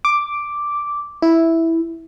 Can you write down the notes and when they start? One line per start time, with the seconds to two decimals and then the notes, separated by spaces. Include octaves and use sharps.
0.05 D6
1.22 E4